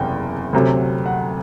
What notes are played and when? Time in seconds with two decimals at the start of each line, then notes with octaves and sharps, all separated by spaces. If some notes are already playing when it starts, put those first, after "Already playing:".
Already playing: F#1 E2 C3 G5
0.53 D2 C3 F#3
1.06 F#5